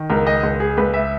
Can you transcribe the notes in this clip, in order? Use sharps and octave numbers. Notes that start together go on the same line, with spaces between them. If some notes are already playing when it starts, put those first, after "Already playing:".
Already playing: D#3
C#2 A#4
D#5
C#2
G#4
C#2 B4
E5